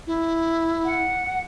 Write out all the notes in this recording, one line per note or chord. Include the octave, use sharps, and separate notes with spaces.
E4
F#5